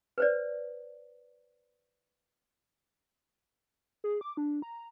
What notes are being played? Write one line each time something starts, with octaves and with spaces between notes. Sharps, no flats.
B4 C5 D5
G#4
D6
D4
A#5